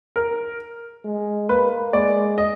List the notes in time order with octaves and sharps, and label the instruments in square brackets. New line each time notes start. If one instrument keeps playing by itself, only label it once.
[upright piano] A#4
[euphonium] G#3
[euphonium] A#3 [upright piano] B4
[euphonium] G#3 [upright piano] D5
[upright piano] D#5